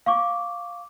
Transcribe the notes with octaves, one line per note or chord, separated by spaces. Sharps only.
F5 C#6 D6